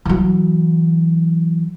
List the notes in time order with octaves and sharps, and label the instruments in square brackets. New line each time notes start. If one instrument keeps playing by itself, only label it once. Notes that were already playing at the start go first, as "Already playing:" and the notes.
[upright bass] E3 F#3